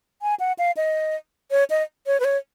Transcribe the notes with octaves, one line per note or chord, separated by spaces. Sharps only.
G#5
F#5
F5
D#5
C#5
D#5
C#5
B4
C#5